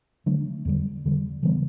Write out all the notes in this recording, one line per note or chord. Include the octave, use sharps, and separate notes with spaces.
D3 F#3 A3 D4
E2 D3 G3
E2 D3 G3
C#3 E3 G3 B3